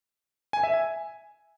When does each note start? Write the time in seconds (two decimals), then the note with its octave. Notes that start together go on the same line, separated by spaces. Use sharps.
0.53 G#5
0.63 E5
0.74 G#5